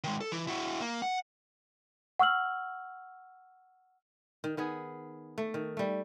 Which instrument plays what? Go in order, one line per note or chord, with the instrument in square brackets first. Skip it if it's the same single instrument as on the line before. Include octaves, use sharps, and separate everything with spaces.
[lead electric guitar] D#3 G#3
A4
E3
E4 F#4
A#3
F#5
[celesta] F#5 C#6 E6 F6 F#7
[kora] D#3
D#3 B3 G#4
A3
D#3
G3 A3